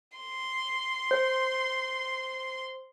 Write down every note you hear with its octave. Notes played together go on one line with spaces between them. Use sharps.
C6
C5